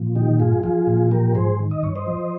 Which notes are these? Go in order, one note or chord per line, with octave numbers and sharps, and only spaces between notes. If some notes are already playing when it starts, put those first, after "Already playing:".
Already playing: A#2 F3
D#3 D#4 G4
G2 F4 G#4
F3 F4 G#4
A#2
F3 G4 A#4
G#2 G#4 C5
D#3
D#5
G2 C#5
C5 D#5
F3